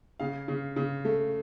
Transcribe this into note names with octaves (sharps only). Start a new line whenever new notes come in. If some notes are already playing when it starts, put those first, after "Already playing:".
C#3 F5
C#3
C#3
A3